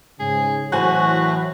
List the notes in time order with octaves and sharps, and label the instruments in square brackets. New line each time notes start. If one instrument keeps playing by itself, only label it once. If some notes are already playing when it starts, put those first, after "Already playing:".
[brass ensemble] G#2 C#3 [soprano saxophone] G#4
[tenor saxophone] A2 [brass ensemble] E3 F#3 [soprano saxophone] F#4 [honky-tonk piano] C5 G#5 F#6